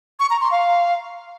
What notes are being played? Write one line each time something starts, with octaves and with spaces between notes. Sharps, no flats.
C#6
A#5
C6
F5